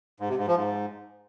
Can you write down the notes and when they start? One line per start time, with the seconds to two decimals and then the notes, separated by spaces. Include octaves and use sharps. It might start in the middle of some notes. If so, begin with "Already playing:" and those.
0.20 G#2
0.29 C3
0.38 G#2
0.48 F3
0.57 G#2